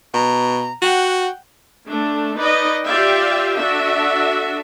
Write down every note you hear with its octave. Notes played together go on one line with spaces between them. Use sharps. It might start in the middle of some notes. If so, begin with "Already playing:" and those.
B2 A#5
F#4 F#5 G5
A3 D4
D#4 B4 D5 D#5
F4 G4 D5 E5 F5 G5
D4 F#4 A4 E5